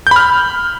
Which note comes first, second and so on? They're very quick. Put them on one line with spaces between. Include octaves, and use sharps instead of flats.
G6 B5 F6